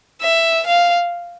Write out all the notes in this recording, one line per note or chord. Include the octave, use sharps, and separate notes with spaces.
E5
F5